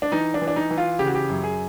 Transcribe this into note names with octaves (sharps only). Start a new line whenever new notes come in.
D4
E3 D#4
D4
E3
D4
D#4
E3
F4
C#3 G4
F#4
G4
F#2
G#4